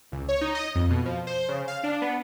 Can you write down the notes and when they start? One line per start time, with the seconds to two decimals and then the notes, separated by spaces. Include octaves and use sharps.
0.12 C#2
0.28 C#5
0.41 D#4
0.55 D#5
0.75 F2
0.90 B2
1.06 F3
1.27 C5
1.49 C#3
1.68 F5
1.84 D4
2.02 B3